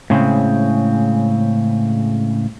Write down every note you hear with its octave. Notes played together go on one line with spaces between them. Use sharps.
A2 C#3 G#3 C4